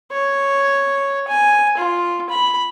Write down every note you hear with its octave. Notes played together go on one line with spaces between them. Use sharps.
C#5
G#5
F4
B5